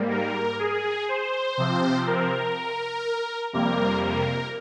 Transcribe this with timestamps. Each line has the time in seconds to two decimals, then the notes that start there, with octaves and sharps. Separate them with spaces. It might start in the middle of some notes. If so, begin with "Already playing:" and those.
Already playing: G#2 G3 A#3
0.11 A#4
0.59 G#4
1.09 C5
1.57 C3 F3 C4
2.07 A#4
3.53 F2 C3 G3 A#3 A#4
4.03 A#4